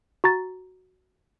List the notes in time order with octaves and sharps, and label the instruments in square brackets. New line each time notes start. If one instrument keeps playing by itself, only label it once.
[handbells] F#4 A#5 A6